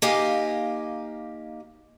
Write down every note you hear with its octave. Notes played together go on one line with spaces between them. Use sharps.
A#3 D#4 G4 D#5 F5 G#5